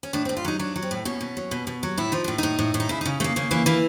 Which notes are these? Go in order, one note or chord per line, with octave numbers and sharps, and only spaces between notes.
C#4
A2 D4
C4
A2
F4
F#3 D#4
F#3 D4
F#3
C4
A2
B2 C#4
B2
F#3
B2
B2
F#3
A2 E4
F3 D#4
A2 D4
A2 D#4
A2
A2
D#4
C#3 E4
D#4
C#3
C#3 A3 A#3
C#3 A#3
E3 A#3
E3 A#3